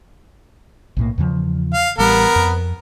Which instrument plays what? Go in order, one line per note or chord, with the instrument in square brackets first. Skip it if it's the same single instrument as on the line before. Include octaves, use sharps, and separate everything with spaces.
[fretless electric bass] B1 A2 A#3
E2 C#3 F3
[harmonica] F5
[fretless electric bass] A1 G3 [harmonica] B3 A#4
[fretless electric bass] F2